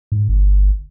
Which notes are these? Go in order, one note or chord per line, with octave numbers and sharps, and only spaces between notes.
G#2
G1